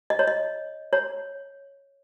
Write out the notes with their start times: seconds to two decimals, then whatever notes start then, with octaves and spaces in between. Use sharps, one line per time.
0.10 D#5
0.19 C#5
0.28 D#5
0.93 C#5